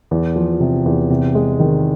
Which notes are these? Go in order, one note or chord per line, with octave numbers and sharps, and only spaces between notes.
E2
F3
C3
E2
C3
G#3
D#3